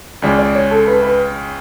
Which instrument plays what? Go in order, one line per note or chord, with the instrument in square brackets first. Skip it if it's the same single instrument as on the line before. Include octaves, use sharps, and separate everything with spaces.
[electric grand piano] C#2 C#3 G#3 [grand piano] D5
[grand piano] D5
C#5
A4
B4
B4